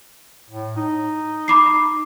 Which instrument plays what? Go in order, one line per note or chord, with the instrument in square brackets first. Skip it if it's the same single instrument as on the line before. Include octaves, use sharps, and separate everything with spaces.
[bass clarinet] A2
D#4
[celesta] B5 D6 C7